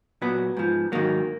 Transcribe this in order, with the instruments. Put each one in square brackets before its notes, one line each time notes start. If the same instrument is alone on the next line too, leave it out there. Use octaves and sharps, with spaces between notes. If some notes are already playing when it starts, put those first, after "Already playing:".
[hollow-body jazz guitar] A#2 F#3 B3
G#2 F3
G#2 D#3 F#3 A#3